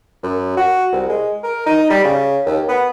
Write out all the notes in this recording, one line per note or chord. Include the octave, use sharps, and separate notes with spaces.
F#2
F#4
C2
G#3
A#4
D#4
G3
C#3
D#2
B3